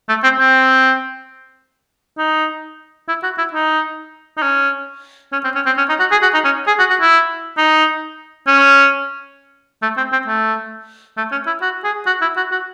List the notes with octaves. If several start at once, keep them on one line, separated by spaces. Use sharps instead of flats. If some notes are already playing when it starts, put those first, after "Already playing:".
A3
C4
C4
D#4
E4
F#4
E4
D#4
D#4
C#4
C#4
C4
C#4
C4
C#4
D#4
F#4
G#4
F#4
D#4
C#4
G#4
F#4
F#4
E4
D#4
C#4
A3
C4
C4
A3
A3
C#4
E4
F#4
G#4
F#4
E4
F#4
F#4